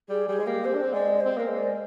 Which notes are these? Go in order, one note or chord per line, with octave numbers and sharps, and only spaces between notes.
G3 G#4
G3 G#4
G#3
A#3 G4
C4 C5
D4
C4
G#3 D5
C4 C5
A#3 A#4
G#3
D5